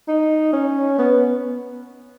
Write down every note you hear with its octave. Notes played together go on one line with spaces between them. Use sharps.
D#4
C#4
B3